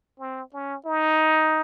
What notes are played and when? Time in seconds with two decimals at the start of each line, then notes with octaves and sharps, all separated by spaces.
0.19 C4
0.53 C#4
0.85 D#4